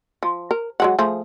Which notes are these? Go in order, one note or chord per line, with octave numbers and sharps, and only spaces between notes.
F3
A#4
F#3 G#3 F#5
F3 A3 G#4